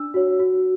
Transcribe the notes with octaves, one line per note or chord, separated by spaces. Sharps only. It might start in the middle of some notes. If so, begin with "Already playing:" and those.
Already playing: D4 E6
F#4 C#5
F#4